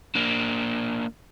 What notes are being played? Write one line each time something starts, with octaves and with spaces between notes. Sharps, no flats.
A#3 D4